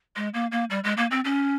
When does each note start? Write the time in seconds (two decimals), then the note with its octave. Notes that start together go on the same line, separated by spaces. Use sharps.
0.16 G#3
0.34 A#3
0.52 A#3
0.70 G3
0.84 G#3
0.97 A#3
1.11 C4
1.25 C#4